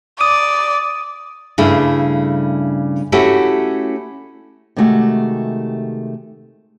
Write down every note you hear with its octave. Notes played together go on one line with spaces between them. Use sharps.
D5 D#6 D#7
G2 C#3 A3 E4
A3 C#4 E4 F#4 G4
C3 D#3 G#3 A3 F#4 G4